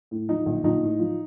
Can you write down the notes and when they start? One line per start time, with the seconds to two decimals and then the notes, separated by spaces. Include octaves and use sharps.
0.11 A2
0.29 F3 D#4
0.46 A#1
0.64 A#1 D#4
0.83 A2
0.99 F3